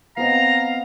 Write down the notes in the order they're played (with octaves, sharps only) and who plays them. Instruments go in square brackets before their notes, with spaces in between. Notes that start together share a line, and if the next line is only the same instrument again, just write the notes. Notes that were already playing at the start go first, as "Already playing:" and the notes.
[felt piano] B3 C4 D#5 [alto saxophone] F5 [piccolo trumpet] A#5